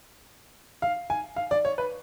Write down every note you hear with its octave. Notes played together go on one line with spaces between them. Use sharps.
F5
G#5
F5
D5
C#5
B4